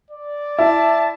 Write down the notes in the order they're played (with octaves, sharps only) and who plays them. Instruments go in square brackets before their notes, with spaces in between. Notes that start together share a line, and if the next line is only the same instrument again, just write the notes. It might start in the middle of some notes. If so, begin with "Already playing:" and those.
[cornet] D5
[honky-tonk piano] E4 [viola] A5